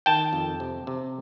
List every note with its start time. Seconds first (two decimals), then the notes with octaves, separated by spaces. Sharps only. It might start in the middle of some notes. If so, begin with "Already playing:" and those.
0.06 D#3 G5 A5
0.33 F2
0.60 C3
0.87 C3